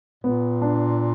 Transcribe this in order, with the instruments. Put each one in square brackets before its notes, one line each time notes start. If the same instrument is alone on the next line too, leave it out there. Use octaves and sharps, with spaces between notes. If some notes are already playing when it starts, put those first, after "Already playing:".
[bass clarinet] A#2 [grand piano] B3
[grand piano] D4